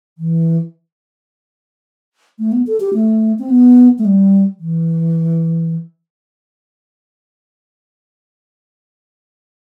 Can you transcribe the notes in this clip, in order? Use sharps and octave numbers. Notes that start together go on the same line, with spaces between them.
E3
A3
B3
A4
G4
A3
C4
B3
A3
G3
E3